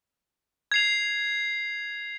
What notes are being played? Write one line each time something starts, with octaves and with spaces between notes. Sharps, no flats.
G#6 C7 F7